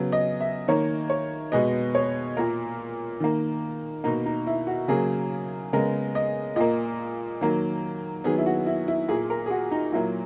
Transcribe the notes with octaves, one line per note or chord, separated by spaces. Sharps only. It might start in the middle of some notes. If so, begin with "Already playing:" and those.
Already playing: C#3 F#3 B3
D#5
E5
D#3 A#3 C#5
C#5
B2 G#3 B3 D#5
C#5
A#2 A#3 A#4
D#3 A#3
B2 A#3 D#4
D#4
E4
F#4
C#3 F#3 A#3 G#4
C#3 G#3 B3 A#4
D#5
A#2 A#3 D#5
D#3 F#3 A#3
D#3 F#3 B3 G#4
E4
F#4
E4
E4
A#2 A#3 G#4
A#4
G#4
F#4
D#4
A#2 F#3 A#3 E4